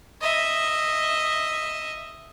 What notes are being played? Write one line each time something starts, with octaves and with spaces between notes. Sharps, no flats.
D#5 E5